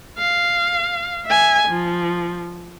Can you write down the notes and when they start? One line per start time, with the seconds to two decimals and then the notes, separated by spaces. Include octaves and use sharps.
0.18 F5
1.25 E5 G#5
1.68 F3